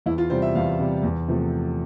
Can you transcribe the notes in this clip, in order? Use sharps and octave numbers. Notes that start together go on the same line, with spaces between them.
E2 E4
F4
C3 G3 C5
E5
E2 F5
C3 G3
E2
C3 F3 A3